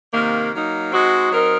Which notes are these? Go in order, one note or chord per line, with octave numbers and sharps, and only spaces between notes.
C3 D#3 A#3
F#3 A#3 D#4
G#3 C4 D#4 F#4
F#3 C4 D#4 A#4